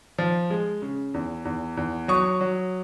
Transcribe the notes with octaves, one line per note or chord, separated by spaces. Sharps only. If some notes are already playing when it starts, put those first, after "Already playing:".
F3
G#3
C#3
E2
E2
E2
F#3 C#6 D#6
F#3